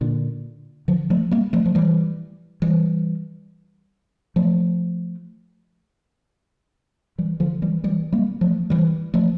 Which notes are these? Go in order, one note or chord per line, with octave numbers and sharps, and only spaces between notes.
A#2 D3
D3 F3
F3 A3
G3 A#3
F3 A3
F3
E3 G3
E3 G3
F3 A3
E3 G3
D3 F3
E3 G3
E3 G3
G3 A#3
F3 A3
E3 G3
F3 A3